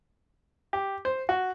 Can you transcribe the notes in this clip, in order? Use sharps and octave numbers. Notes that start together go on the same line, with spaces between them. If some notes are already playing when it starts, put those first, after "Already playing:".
G4
C5
F#4